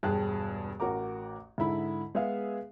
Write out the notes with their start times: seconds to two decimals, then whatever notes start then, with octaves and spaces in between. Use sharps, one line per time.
0.03 E1 G2 G#4 G5 A5 F#6
0.80 A1 F#4 A#4 A#5 D6
1.58 G#2 D3 E4 B5
2.15 G#3 B3 G#4 E5 F5